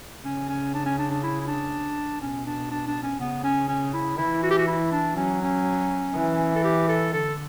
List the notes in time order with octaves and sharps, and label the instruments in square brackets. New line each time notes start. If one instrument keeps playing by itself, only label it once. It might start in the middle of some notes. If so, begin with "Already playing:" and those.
[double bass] C#3 [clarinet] C#4
[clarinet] C#4
D4
C#4
D4
D4
E4
E4
D4
[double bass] B2 [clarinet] C#4
[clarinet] D4
D4
D4
C#4
[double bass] C#3 [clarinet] B3
[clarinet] C#4
C#4
E4
[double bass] E3 [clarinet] E4
[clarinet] F#4
G4
F#4
E4
D4
[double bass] F#3 [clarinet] C#4
[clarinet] C#4
[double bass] E3
[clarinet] A4
G4
A4
[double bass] D3 [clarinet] A4